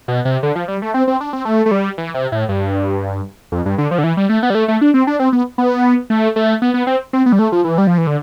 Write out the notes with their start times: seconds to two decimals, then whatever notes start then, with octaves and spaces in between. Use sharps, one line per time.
0.08 B2
0.25 C3
0.43 D3
0.55 F3
0.68 G3
0.82 A3
0.94 C4
1.07 C4
1.21 D4
1.33 C4
1.45 A3
1.66 A3
1.71 G3
1.98 E3
2.14 C3
2.32 A2
2.49 G2
3.52 F2
3.66 G2
3.78 D3
3.91 F3
3.98 D3
4.04 E3
4.17 G3
4.29 A3
4.43 B3
4.50 G3
4.55 A3
4.68 A3
4.81 D4
4.94 C4
5.07 D4
5.20 C4
5.33 B3
5.58 B3
6.10 A3
6.36 A3
6.62 B3
6.74 B3
6.87 C4
7.13 C4
7.26 B3
7.32 G3
7.39 A3
7.52 F3
7.64 E3
7.78 G3
7.87 F3
7.98 E3
8.07 D3